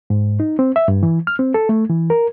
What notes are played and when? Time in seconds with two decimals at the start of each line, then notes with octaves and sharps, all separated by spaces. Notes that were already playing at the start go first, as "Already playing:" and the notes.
0.10 G#2
0.40 D#4
0.59 C4
0.76 E5
0.88 G2
1.03 E3
1.27 F6
1.39 C4
1.54 A4
1.69 A3
1.89 E3
2.10 A#4